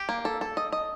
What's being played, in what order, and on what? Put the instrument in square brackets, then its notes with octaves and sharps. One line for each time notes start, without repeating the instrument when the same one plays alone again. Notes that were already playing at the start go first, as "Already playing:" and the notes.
Already playing: [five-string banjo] G4
A#3
A4
A4
D#5
D#5